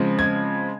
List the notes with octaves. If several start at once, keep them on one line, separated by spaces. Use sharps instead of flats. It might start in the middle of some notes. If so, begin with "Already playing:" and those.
Already playing: C#3 F3 G#3 C4
G#6